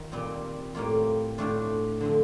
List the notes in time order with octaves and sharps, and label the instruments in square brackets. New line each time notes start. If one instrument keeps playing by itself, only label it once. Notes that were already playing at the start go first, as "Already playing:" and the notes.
Already playing: [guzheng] D#3 F4
A#2 G3 C4
A2 G3 A#3 F4
A2 A3 D4 F4
D3 F3 C4